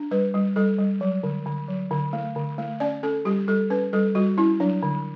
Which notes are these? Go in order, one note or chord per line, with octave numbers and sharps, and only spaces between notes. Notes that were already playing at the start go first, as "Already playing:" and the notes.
Already playing: D4
G3 B4
G3
G3 A4
G3
F#3
D3
D3
F#3
D3
A3
D3
A3
C#4 D5
C#4 A4
G3 G4
G3 A4
C#4 B4
G3 A4
G3 F#4
C#4 E4
F#3 D4
D3